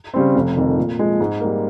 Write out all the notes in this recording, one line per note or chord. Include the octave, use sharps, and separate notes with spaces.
C#3 G3 C4
F1
F2 D#3
A#2
F3 G#3
G#2
G3 A#3